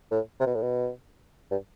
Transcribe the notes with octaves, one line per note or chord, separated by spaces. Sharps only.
A2
C3
B2
A2
B2
G2